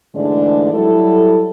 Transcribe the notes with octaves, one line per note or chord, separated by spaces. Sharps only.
G#2 D3 E3 G#3 A3 D4
F#3 G3 E4 A4